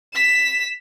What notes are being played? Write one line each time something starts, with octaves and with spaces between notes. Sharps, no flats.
B6 E7